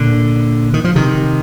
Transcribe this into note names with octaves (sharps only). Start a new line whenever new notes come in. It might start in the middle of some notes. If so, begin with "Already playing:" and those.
Already playing: A#2 D3
D#3
F3
C3 D#3